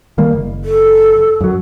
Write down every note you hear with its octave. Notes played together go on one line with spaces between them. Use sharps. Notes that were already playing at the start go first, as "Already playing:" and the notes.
D#3 G3 A#3
F#1
A4
F#2 F#3